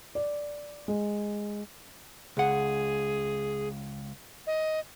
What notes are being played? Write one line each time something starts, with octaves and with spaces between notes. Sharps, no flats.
D5
G#3
C#2 G#4 F#5
D#5